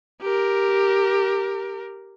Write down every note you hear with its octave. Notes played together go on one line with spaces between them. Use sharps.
G4 A#4